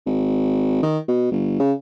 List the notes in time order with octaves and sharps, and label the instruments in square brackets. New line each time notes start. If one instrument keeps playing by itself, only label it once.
[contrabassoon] G#1
D#3
B2
G1
C#3